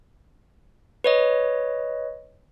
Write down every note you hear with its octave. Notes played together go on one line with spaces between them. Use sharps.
B4 C#5 D#5